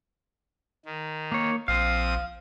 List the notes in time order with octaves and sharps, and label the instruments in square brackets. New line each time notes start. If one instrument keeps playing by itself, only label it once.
[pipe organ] D#3
[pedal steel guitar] A#3 C#5
[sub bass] A#1 [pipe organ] F3 C4 D#6 [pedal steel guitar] F5